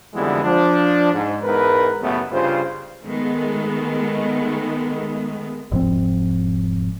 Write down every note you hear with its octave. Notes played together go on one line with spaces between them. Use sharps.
F2 D3 E3 G3 G#3 B3
F3 D4
G#2
E2 G#2 A#4 B4
A1 F#2 C#3 A3 B3
G2 C#3 F4 C5
D#3 G#3 A3 B3
E1 G#2 F3 C4